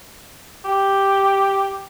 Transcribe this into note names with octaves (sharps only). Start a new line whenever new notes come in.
G4